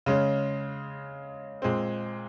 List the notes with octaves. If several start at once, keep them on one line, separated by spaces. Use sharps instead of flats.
C#3 G#3 C#4
A#2 G#3 C4